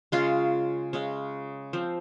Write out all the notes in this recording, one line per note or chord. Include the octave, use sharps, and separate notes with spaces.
C#3 G#3 C#4 F4
C#3 G#3 C#4
F3 C4